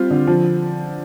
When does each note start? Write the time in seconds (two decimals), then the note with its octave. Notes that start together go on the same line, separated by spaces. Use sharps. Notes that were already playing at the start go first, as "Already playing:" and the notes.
Already playing: G3 C4 F4
0.10 D3
0.27 F3